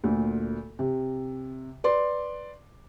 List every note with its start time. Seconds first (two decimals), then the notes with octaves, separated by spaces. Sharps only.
0.04 D2 A#2
0.79 C3
1.84 B4 D5 C6